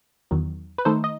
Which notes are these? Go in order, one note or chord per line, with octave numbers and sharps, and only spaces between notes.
E2 D#3 F#3
B4
D#3 A3 D#4 A4 C5
D#5